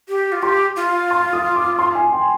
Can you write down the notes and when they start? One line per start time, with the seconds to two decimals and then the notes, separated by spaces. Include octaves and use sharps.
0.09 G4
0.32 F4
0.42 G4 C6
0.76 F4
1.11 C6
1.33 D#6
1.56 D6
1.79 C6
1.95 G#5
2.12 G5